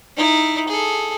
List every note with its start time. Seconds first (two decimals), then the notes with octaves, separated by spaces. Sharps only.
0.16 D#4 E4
0.68 G#4 A4